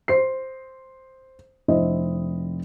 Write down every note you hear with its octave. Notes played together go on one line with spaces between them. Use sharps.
C5 C7
F1 C4 D4 E4 D#5